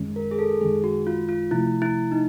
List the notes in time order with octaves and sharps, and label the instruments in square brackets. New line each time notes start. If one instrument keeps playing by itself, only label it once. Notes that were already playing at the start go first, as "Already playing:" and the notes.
Already playing: [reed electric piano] F#2 D#3 G#3 C#4
[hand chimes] A#4
G#4
A4
[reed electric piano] F#2 D#3 G#3 [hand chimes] G#4
[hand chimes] F#4
F4
F4
[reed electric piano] C3 F3 A3 [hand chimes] E4
[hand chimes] E4
D#4